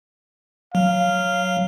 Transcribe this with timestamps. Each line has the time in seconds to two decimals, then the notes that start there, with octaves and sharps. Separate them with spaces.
0.75 F#3 F5